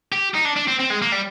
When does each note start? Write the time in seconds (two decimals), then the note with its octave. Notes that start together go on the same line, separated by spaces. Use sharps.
0.12 G4
0.34 D#4
0.45 D4
0.56 D4
0.67 C4
0.79 C4
0.90 G#3
1.02 A#3
1.12 G3